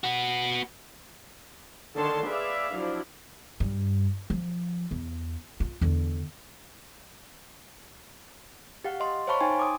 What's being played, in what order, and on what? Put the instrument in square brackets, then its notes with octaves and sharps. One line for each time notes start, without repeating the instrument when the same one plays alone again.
[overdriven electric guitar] B3 F#4
[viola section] D3 D#3 C#5 A5 C6
G#4 B4 D5 E5 F5
F3 F#3 D4 E4
[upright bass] G2
F3
E2
F4
E2 D3
[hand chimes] G4 F5 F#5
D#5 C6
C5 C#5 F5 A5 B5 C#6
D#4 G5 G#5 C6
D6 D#6